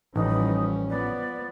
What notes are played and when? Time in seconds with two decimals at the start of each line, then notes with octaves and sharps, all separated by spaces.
0.16 A1 E3 F3 G3 C#4 D#4
0.90 F3 B3 D5